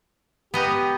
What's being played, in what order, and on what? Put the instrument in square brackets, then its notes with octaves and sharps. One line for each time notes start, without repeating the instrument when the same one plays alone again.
[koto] B3 D#5 A#5 [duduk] G4